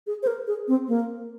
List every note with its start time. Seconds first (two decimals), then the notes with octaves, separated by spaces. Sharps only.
0.07 G#4
0.23 C5
0.27 A#4
0.47 G#4
0.68 C4
0.88 A#3